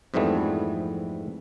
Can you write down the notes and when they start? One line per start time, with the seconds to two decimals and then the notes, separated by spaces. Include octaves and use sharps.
0.14 F2 G#2 E3 G3 A3 B3